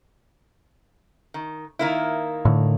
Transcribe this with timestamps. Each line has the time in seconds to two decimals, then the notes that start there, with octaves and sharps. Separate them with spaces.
1.34 D#3
1.79 D#3 A#3 E4
2.45 A2 D3